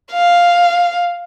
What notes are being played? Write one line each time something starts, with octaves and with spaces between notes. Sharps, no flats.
F5